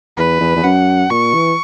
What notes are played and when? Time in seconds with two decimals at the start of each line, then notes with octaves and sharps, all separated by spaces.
0.17 E2 B4
0.40 E2
0.56 E2
0.63 F#2 F#5
1.10 A#2 C#6
1.34 E3